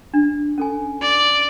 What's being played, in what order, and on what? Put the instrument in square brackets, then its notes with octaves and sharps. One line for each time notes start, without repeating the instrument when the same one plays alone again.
[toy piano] D4
C#4 A4 G#5
[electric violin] D5